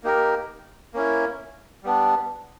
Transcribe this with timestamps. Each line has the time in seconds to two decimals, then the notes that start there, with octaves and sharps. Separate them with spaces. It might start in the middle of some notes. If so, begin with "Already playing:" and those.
0.03 A#3 D#4 G4 A#4
0.94 A#3 C#4 E4
1.84 G3 B3 D4